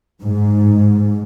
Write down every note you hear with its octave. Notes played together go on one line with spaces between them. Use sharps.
G#2